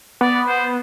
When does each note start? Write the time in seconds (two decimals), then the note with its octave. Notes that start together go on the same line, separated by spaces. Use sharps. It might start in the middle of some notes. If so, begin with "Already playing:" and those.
0.21 B3 D5
0.48 C5